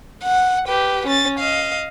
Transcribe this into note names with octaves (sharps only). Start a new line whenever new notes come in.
F#5
G4 B4
C#4 A6
D#5 F5